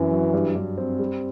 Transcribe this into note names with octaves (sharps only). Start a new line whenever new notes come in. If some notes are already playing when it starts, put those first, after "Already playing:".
Already playing: F#2 E3 F#3
F#3
G2
G2
C4
G3